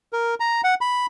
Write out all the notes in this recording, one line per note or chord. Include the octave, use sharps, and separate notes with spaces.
A#4
A#5
F#5
B5